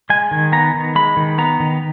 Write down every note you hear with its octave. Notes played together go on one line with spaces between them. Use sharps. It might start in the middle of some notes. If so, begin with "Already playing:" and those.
G#3 G#5
D#3
B3 A#5
D#3
G#3 B5
D#3
B3 A#5
D#3